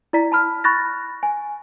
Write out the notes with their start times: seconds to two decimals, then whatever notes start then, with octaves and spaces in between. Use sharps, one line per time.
0.13 E4 D5 A#5 B6
0.32 A5 B5 F6
0.64 B5 C#6 F#6 A6 A#6
1.23 G#5